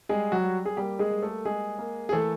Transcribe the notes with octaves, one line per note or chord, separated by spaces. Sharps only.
G3 G#3 G#4
F#3 F#4
G3
G#4
G3 A#3 G4
G#3 G#4
G3
A3 A4
G#3 A#3 G#4
A#3
G#4
E3 A3 A4